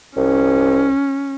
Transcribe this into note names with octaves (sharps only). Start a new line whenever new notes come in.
C2 C#4